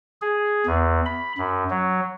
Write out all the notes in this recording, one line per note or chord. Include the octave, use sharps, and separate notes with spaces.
G#4
E2
B5
F#2
F#3